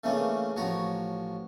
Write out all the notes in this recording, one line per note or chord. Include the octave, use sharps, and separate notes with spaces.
C#3 E3 A3 A#3 C#4 D4
A1 F3 F#4 C#5 A#5